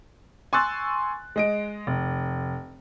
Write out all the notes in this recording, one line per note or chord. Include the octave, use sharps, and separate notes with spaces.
G#5 C6 C#6 E6 F#6 A6
G#3 D#5 D7
F1